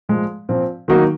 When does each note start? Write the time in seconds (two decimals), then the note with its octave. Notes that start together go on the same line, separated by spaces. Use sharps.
0.09 A#2 F3 G#3
0.49 A#2 F3 C4
0.88 D#3 F#3 A#3 D#4 F#4